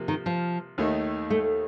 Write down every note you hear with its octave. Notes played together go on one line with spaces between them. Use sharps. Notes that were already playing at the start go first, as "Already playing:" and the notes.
Already playing: C3 F3 A#3
D#3
F3
D#2 D#3 A3 D#4
A3